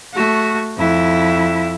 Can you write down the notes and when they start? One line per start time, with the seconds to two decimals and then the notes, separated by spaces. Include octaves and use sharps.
0.14 A3 F#4
0.77 F2 E4